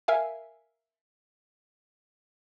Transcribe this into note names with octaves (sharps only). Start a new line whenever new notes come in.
A#4 E5 F5 G#5